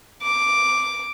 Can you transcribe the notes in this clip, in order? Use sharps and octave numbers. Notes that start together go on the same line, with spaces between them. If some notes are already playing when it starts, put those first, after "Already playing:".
D6